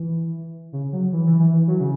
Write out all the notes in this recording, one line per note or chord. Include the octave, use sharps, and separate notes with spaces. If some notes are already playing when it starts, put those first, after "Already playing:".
Already playing: E3
C#3
F#3
E3
E3
E3
E3
F#3
C#3